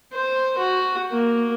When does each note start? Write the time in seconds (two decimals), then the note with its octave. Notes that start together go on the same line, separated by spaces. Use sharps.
0.12 C5
0.58 F#4
1.12 A#3